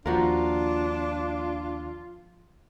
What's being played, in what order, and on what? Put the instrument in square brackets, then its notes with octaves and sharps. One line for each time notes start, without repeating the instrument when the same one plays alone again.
[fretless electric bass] D#2 [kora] F3 F#4 A#4 [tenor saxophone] D4 [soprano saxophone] F4